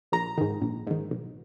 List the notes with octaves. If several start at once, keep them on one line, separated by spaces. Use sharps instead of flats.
A#1 A#5
G#2 D#3
A#1
G#2 D#3
B1